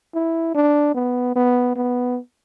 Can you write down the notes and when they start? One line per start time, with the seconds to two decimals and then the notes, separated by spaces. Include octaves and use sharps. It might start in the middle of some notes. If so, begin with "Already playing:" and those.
0.15 E4
0.55 D4
0.94 B3
1.36 B3
1.76 B3